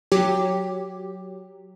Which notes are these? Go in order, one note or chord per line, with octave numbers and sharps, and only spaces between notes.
F#3 G4